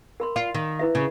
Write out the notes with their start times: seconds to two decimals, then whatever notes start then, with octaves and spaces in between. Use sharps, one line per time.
0.20 A#4 B5 C6
0.36 F4
0.54 D#3
0.79 E4 B4 E5
0.95 C#3